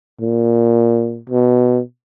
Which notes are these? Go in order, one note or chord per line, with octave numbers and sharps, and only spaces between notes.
A#2
B2